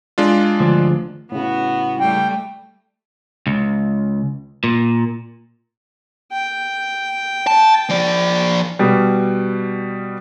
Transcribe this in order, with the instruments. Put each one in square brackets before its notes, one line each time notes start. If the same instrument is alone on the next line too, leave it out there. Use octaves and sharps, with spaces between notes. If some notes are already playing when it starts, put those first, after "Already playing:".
[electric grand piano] G#3 D4 F4
[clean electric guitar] D2 F3
[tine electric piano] A2 C#3 [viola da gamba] B3 F#4
[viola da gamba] G3 A3 [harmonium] G5
[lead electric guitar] C#2
A#2
[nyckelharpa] G5
[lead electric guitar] A5
F3 D5
[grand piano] B2 G3